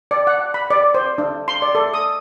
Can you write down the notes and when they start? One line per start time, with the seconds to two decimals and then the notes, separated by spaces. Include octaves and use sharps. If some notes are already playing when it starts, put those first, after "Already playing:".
0.11 D5
0.27 F#5
0.54 B5
0.70 D5
0.95 C5
1.18 D4
1.48 C6
1.62 D5
1.75 A4
1.94 D#6